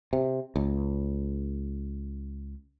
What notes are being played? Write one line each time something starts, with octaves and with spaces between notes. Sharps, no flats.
C3
C#2